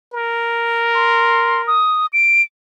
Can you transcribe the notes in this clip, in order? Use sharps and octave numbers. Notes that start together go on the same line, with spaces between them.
A#4
C6
D#6
D7